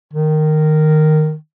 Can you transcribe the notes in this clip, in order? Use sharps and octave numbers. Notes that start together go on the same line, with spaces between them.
D#3